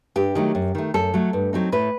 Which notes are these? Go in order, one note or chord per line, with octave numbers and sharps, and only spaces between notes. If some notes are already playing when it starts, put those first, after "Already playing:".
G2 G4
D#3 F#3 A3
F#2
D#3 A3
F#2 A4
F#3 A3
G2
F#3 C4 D#4
A2 B4